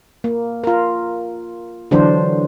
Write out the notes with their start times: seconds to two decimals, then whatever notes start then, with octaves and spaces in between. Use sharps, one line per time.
0.24 A#3
0.64 F4 A#4
1.91 D3 E3 F#3 D4 C5